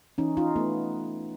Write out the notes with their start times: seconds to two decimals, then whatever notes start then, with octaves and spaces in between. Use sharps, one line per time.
0.18 E3 C#4 D#4
0.37 D#4 F4
0.56 A3 B3